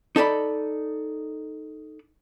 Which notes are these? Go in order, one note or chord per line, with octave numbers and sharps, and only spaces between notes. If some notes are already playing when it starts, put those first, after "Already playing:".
D#4 A4 D5 B5